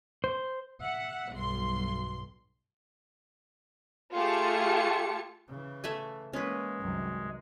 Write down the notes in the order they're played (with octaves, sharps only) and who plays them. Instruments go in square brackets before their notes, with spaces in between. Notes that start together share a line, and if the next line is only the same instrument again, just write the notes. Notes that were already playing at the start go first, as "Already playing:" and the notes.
[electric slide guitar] C5
[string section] E5 F#5
B1 G2 C6
[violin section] A3 F4 G4 G#4 A5 C#7
[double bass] C#3 E3
[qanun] A3 E5 G#5
[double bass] E3 A#3 [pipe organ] G#3 [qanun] C#4 B4
[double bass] C2 D#3 [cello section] F#2